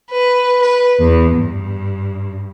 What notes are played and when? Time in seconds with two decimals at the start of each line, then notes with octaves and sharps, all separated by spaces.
0.11 B4
0.61 B4
0.99 E2
1.37 G2